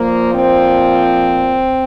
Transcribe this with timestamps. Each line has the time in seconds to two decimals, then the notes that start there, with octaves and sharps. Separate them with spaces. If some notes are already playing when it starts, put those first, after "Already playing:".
Already playing: A#2 F3 A#3
0.34 C4